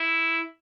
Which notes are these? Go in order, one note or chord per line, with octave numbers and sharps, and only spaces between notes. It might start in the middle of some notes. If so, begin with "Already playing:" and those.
Already playing: E4